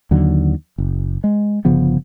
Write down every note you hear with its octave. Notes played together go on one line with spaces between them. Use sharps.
D#2 D3 F#3
F#1
G#3
G1 C#3 F3 B3